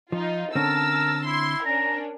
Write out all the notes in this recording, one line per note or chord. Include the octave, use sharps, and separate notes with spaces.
F3 D#4 F4
D3 C4 C#4 A#4 A5 E6
E4 C6
C#4 D4 A#4 A#5